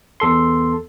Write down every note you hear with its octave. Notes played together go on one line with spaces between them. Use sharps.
E2 A4 C6